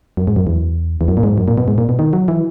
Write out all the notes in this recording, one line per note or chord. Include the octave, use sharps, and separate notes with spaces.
F#2
G#2
F#2
E2
E2
F#2
A#2
G#2
F#2
A#2
B2
G#2
A#2
B2
D#3
F#3
E3